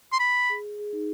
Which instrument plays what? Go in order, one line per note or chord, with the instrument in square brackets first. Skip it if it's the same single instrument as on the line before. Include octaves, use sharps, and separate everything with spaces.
[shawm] C6
B5
[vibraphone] G#4
G#4
D#4